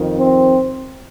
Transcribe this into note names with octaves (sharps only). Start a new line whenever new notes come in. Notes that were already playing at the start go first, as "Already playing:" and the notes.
Already playing: F2 D#3
C4